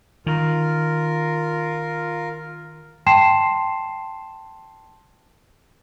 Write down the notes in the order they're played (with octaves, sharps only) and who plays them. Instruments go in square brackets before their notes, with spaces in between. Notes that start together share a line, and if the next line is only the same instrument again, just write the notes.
[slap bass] D#3 [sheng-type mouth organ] F4 A#4
[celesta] G5 A5 C6 C7 E7